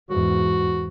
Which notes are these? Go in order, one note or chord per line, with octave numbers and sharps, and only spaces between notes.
E2 G#2 F#4